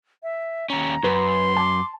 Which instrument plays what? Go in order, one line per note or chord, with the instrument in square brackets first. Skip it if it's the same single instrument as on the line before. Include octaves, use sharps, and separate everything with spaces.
[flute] E5
[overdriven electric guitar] D#2 C#4 [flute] A#5
[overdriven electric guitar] F#2 [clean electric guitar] B4 [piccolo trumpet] C6
[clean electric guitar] A5 [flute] D6